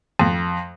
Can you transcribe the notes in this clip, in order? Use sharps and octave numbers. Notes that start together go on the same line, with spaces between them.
F2